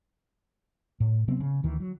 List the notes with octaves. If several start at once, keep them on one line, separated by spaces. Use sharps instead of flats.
A2
C3 F#3 B3 C4
C#3
D2 D#3 E3
F#3